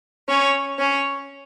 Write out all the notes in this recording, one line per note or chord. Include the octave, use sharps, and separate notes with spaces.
C#4 C#5
C#4 C#5